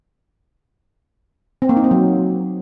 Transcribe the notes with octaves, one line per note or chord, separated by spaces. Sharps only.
C4
A#3
D#4
C4
F#3